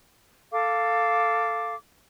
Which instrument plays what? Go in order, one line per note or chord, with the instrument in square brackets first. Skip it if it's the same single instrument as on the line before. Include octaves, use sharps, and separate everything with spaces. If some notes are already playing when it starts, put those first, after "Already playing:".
[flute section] A4 F5 D6